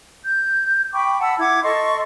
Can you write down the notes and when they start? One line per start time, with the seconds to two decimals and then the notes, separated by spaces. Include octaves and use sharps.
0.25 G6
0.93 G5 B5 C#6 D6
1.20 F#5 A5 B5 E6
1.39 E4 F#5 D6 G#6
1.63 A4 D#5 C6 C#6